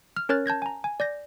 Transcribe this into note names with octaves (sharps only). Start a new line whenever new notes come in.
F6
C#4 A#4 C#5 F6 F#6 A6
A5 G6 G#6 A#6
G#5 A#5
G#5
D5 G6 A#6